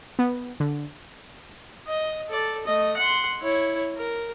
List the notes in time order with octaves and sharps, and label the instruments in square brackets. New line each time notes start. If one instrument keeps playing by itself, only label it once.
[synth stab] B3
D3
[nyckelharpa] D#5
A4 D5
A3 D#5
F#5 C6
E4 C#5
A#4